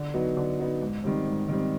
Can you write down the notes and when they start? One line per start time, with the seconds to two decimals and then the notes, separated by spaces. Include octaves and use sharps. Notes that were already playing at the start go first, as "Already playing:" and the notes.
Already playing: D3
0.14 F#3 B3 D#4
0.37 D3
0.59 F#3 B3 D#4
0.82 G#2
1.04 D#3 G3 C4
1.27 G#2
1.49 D#3 G3 C4